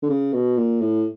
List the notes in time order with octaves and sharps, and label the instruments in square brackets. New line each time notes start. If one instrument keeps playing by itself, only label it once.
[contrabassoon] D3
C#3
B2
A#2
A2